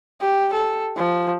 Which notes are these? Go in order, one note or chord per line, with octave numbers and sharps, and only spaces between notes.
G4
A4
F3